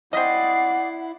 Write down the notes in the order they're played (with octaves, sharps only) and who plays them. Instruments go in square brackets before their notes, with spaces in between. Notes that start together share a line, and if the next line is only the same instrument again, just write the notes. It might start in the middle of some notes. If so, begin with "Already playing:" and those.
[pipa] C4 D#5 [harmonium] E4 [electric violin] D5 C7 [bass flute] F#5